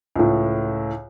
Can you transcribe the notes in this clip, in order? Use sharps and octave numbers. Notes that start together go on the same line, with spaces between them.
C#2 A2